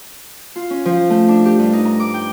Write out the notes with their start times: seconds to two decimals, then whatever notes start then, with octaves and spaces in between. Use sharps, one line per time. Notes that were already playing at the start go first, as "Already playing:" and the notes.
0.56 F4
0.70 C#4
0.85 F3
1.10 A3
1.28 D4
1.45 G4
1.59 G2
1.73 D#4
1.85 A#5
2.00 D6
2.14 G5